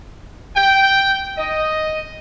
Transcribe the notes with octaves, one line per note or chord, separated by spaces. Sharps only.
G5
D#5